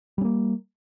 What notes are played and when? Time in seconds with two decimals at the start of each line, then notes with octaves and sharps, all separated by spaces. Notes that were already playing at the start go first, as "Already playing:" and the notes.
0.18 G3
0.21 C#4
0.25 A#3